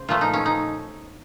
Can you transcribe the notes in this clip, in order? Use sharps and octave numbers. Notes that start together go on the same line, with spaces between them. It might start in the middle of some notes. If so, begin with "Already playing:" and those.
Already playing: C#3 C5
A#2 F3 A3 F4
D#4
C#4
D#4